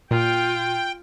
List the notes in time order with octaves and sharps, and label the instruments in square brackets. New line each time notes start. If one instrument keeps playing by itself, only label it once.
[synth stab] A#2 [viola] F4 [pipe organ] G5